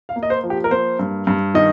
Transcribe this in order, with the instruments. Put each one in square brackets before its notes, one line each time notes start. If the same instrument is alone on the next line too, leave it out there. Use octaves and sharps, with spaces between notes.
[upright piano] F5
A#3
D#5
C5
F3
G4
A#4
A#3 C5
G2
G2
D#3 D#5